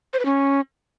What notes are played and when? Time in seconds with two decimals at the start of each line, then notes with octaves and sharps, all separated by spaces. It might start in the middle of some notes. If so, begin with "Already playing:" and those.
0.13 C5
0.19 B4
0.25 C#4